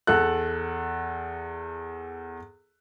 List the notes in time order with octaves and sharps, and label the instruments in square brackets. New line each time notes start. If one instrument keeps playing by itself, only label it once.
[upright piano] E2 A4 F#6